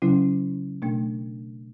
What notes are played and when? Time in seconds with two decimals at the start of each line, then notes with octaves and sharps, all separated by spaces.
0.02 C#3 F#3 C#4 E4
0.82 B2 A3 D4